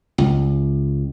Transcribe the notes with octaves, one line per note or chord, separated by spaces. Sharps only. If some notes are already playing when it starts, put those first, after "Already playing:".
C#2